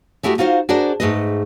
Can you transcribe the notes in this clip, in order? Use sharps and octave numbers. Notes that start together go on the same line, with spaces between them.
G#3 A3 E4 F#4 G4
D#4 F4 F#4 C5 F5
D4 F#4 G#4 A#4 C5 D5
G#2 A3 G#4 B4 D#5